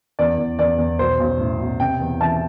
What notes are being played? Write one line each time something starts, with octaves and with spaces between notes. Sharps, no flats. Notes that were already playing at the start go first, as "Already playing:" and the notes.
E2 D5
E2
E2 D5
E2
B1 C5
B1
A2
B1
C3 G5
E2
E3 A5